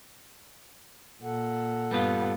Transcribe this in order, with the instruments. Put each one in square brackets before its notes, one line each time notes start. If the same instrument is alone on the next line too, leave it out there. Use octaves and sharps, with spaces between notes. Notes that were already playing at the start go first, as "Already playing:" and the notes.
[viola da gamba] A#2 [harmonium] A4 F#5
[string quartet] G2 B3 [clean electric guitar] G3 F4